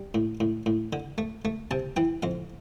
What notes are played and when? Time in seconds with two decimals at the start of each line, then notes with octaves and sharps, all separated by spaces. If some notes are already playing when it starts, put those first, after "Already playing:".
Already playing: G3
0.14 A2
0.40 A2
0.66 A2
0.93 D3
1.18 A3
1.45 A3
1.71 C3 A5
1.96 E3 G5
2.23 F2 F5